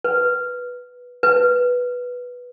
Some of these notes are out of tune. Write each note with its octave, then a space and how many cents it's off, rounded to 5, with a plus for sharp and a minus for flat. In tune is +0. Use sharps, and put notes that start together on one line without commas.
B4 -15
B4 -5